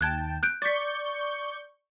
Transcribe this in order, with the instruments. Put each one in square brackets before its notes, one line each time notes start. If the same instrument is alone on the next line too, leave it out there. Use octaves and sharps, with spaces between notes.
[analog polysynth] D#2 G5 A5 [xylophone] F#6 G#6
[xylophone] F#6 G6 D7
[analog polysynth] D5 C#6 G6 [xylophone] A6 B6